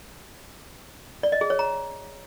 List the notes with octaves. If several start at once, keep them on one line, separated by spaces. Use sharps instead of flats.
D5
D#5
G#4
C#5
A#5